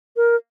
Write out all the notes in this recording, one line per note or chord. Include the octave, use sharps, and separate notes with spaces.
A#4